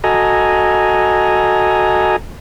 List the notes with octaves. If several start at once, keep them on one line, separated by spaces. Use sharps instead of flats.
F#4 A4 D#5 G#5 A#5